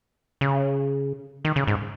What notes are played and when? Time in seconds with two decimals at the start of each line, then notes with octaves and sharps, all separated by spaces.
0.41 C#3
1.45 D#3
1.56 C#3
1.67 G#2